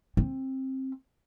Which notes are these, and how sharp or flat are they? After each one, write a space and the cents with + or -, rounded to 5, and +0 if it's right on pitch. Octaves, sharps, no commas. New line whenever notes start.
C4 +20